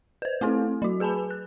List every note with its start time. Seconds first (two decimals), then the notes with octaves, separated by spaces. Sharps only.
0.22 B4 C5
0.41 A3 C4 E4 A4
0.82 F#3 F#4
1.00 G#4 B4 G#5 A5 B5
1.31 F#6